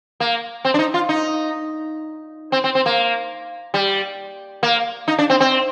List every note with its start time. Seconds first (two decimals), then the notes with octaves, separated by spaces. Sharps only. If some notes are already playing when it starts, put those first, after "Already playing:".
0.20 A#3
0.65 C4
0.74 D4
0.79 D#4
0.94 F4
1.09 D#4
2.52 C4
2.64 C4
2.75 C4
2.86 A#3
3.74 G3
4.63 A#3
5.08 D#4
5.19 D4
5.30 C4
5.40 C4